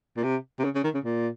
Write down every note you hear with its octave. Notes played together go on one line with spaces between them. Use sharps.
A#2
C3
C3
C#3
C#3
D#3
C#3
A#2